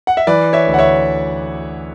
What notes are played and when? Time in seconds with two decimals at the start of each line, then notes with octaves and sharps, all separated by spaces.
0.07 F#5
0.17 E5
0.27 E3 B4 D5
0.53 C#5 E5
0.67 D2
0.74 F#5
0.79 C#5 E5